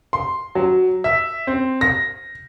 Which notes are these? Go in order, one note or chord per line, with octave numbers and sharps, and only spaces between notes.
C6
F#3
E5
C4
A#6